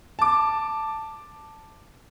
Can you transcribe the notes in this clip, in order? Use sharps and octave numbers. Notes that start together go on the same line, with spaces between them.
A5 D6